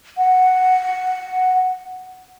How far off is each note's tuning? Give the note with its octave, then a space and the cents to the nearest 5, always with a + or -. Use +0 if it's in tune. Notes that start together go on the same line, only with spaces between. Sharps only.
F#5 +0